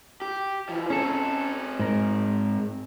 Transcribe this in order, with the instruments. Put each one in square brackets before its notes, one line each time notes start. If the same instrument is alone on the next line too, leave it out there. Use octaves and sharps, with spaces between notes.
[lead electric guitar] G4
E3 F3
[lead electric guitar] C4 G#4 [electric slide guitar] C#4 A4
[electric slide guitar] G#2 A#4